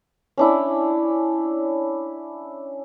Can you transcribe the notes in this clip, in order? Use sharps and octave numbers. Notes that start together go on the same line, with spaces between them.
C#4 D4 E4